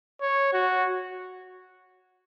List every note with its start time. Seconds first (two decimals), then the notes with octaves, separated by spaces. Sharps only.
0.22 C#5
0.53 F#4